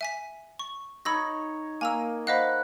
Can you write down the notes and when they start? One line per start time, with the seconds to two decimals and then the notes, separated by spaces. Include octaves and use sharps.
0.01 E5 G#5 B6
0.59 C#6
1.05 D#4 C#5 B5 C#6 E6 A#6
1.81 A#3 G#5 A#5 E6
2.27 C5 D#5 F5 F#5 B5